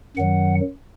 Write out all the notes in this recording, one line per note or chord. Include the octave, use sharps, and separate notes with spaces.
F#2 D#3 F#3 F#5